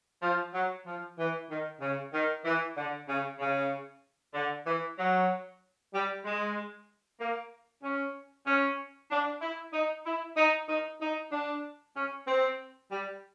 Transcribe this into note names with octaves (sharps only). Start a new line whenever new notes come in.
F3
F#3
F3
E3
D#3
C#3
D#3
E3
D3
C#3
C#3
D3
E3
F#3
G3
G#3
A#3
C#4
C#4
D4
E4
D#4
E4
D#4
D#4
D#4
D4
C#4
C4
G3